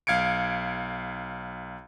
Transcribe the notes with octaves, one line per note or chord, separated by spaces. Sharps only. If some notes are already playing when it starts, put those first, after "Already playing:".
B1 F5 G#6 C#7 D7